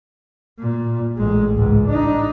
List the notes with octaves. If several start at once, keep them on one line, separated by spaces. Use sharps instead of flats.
A#2
A1 G#3
C#2 G#2
D4 D#4